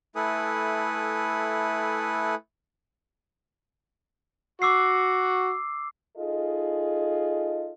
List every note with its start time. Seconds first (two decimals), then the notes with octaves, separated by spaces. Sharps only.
0.16 A3 E4 A4 B4 G#5 D#6
4.62 F#4 D6 E6 C7
6.17 D#4 F4 G#4 A4 D#5